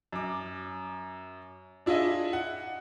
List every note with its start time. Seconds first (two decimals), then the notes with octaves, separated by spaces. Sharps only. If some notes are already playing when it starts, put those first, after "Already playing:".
0.13 F#2 D6
1.86 D4 E4 F4 G#4 D#5 E5
2.33 F#5